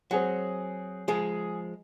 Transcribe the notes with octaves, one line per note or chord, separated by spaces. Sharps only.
F#3 C4 G#4 F#5
F3 G#3 G#4